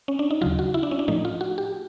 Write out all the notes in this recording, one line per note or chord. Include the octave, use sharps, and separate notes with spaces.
C#4
D4
D#4
D#2 C#3 F#3 F4
F#4
E4
D4
C#4
D4
A2 F3 A3 D#4
F4
F#4
G4